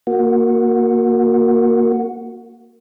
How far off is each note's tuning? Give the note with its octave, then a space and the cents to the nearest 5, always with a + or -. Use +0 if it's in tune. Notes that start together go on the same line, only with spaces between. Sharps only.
A#3 +0 F#4 -15